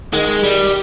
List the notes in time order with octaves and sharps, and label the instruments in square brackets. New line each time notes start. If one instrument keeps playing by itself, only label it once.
[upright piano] D#3 [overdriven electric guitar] G#3
[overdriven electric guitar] G3